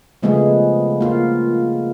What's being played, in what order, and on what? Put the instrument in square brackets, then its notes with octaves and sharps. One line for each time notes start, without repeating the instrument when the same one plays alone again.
[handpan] C#3 F3 G#3 A3 B3 G#4
A#3 F4